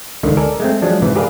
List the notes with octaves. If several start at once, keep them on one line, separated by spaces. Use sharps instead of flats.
C#2 D3 D#3
A4 A#4 D5 G#5
G#3 A3 C4
F3 F#3 G#3 D4
G#2 C3 E3
G4 G#4 A#4 B4 D5 F5